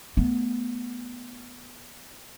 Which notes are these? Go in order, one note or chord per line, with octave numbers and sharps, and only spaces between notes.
A3 B3